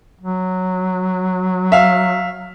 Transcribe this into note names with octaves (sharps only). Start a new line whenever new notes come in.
F#3
E5 F5